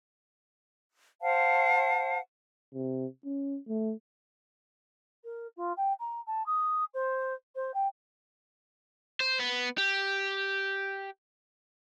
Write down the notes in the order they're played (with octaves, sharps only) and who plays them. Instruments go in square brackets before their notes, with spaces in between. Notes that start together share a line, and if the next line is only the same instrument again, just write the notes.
[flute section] C5 F5 F#5 A5
[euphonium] C3
C#4
A3
[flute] A#4
F4
G5
A#5
A5
D#6
C5
C5
G5
[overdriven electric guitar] C5
B3
G4